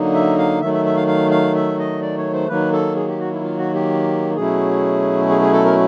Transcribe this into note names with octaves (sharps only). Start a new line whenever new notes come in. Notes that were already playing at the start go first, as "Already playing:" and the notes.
Already playing: D3 F#3 A#3 D#4
E5
F5
D#3 F#3 A3 E5
E5
E5
F5
F5
F5
E5
D#5
D5
C#5
C5
D#3 F#3 A#3 B4
A4
G#4
G4
F#4
E4
F4
F#4
G4
B2 F#3 A3 C#4 E4 G#4
G#4
G#4
A4
A#4